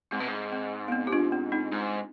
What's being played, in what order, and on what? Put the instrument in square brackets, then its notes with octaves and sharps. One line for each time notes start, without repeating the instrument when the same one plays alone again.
[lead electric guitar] G#2 [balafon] C4
[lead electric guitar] B2
G#2
[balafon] C4
B3
C4
G4
D4 F4
C4
C4 D#4
[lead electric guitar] G#2